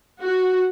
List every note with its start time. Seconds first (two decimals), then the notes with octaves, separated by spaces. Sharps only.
0.21 F#4